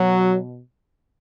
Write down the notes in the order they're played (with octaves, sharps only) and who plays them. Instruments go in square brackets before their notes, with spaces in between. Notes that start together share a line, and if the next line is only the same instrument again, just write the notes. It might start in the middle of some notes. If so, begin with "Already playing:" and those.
Already playing: [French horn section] B2 F#3